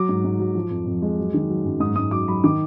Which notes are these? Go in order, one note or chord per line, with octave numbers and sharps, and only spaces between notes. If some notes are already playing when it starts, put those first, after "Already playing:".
Already playing: F#3 D6
G#2
G#2
F#3
F3
F2
F2
G#3
F#3
D#3
F#3
F#2
G#2 D#6
G#2 D#6
F#3 D6
F#3 B5
D#3 D6